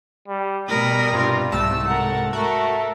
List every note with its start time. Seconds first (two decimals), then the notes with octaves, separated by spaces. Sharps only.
0.28 G3
0.68 B2 G3 A#4 B5 D#6
1.13 G2 C3 F4
1.52 C2 G#2 A3 A5 E6
1.88 A#4 F#5
2.33 A3 F#4 A4 A#4